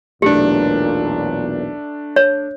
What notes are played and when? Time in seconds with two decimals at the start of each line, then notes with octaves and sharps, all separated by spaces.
0.22 B1 E2 A#2 A3 D4 G4
2.16 C#5